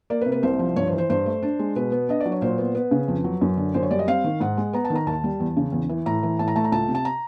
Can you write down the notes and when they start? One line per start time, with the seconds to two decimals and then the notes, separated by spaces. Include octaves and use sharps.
0.10 A#3 D5
0.21 B4
0.26 C3
0.32 B4
0.43 C2 C5
0.59 F3
0.76 G2 C#5
0.87 C5
0.92 E3
0.98 C5
1.10 G2 C5
1.26 A3
1.43 D4
1.59 G#3
1.76 B2 B4
1.92 B3
2.09 D4 D#5
2.21 D5
2.26 F#3
2.32 C#5
2.41 A#2 C5
2.58 B3
2.75 B3 B4
2.91 C#3
3.08 F2
3.24 F#3
3.41 F#2
3.57 D3
3.74 F#2 C5
3.83 C#5
3.91 G3 D5
3.99 D#5
4.07 C4 F5
4.24 D#3
4.40 G#2 F#5
4.57 G#3
4.73 B3 A#5
4.85 A5
4.90 D#3
4.95 A#5
5.07 D#2 A5
5.24 G3
5.40 E2
5.57 C#3
5.72 E2
5.89 E3
6.06 A2 A#5
6.23 E3
6.39 A2 A5
6.48 A#5
6.55 A3 A5
6.64 A#5
6.72 C#2 A5
6.88 C3
6.95 A5
7.05 A#5